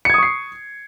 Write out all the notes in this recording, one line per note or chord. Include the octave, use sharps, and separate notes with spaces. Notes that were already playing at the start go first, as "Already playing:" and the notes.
C#6 D#6 G#6 C7 C#7